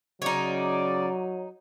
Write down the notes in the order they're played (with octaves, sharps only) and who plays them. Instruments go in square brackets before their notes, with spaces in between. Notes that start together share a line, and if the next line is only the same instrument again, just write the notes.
[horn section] C#3 D5 [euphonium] F#3 [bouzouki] D#4 C#5